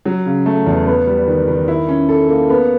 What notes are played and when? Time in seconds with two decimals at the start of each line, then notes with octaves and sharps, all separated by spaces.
0.06 F#3
0.26 C#3
0.46 A3
0.66 E2
0.87 B3
1.07 G3
1.27 D#3
1.48 D#3
1.68 E4
1.88 C#4
2.09 A4
2.29 A#3
2.50 B3